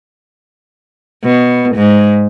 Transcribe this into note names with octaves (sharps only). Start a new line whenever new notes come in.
B2
G#2